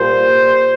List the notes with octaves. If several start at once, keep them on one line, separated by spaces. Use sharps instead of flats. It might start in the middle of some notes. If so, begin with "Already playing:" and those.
Already playing: A#2 G3 A#3 C5